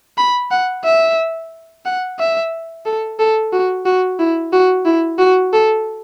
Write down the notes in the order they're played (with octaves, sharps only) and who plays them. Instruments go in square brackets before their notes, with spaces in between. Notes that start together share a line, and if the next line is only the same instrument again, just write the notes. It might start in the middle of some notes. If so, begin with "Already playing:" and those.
[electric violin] B5
F#5
E5
F#5
E5
A4
A4
F#4
F#4
E4
F#4
E4
F#4
A4